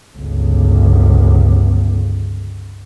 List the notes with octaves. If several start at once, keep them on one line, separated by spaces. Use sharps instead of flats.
G1 C#2